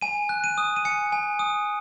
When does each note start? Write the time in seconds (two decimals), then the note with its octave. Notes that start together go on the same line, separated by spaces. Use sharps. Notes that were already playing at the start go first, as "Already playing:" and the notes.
0.01 G#5 D#7
0.29 F#6
0.44 D#7
0.58 D#6
0.76 D#7
0.85 G#5 C#7
1.12 G#5
1.39 D#6